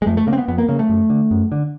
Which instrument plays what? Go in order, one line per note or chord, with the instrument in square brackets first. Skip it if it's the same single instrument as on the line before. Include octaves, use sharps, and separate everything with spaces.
[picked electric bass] G#3
F2 A3
A3
C#3 A#3
C4
B3
F2 B3
A#3
C#3 A#3
A3
F#2
D3
F#2
D3